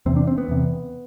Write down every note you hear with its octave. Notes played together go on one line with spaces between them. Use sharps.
E2 C3 C4
D4
C4
B3
E2 C3